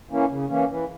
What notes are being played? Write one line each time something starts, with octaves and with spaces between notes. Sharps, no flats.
E3 A#3 C#4
C#3
E3 A#3 C#4
E3